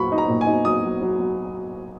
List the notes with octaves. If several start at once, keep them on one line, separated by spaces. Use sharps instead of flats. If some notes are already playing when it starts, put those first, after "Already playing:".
Already playing: A#2 F#3 A#3 B5 C#6
D#4
A#5
A#2
G#5
D#4
F#3 D#6
F#3
F#3
F#3